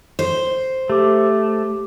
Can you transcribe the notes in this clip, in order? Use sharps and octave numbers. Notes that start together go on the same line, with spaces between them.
C5
A3 G4 D6